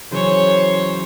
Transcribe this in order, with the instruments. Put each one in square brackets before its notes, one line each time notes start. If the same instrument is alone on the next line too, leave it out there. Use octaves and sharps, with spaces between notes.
[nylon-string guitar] C#3 E3 F#3 [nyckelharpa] C5 C#5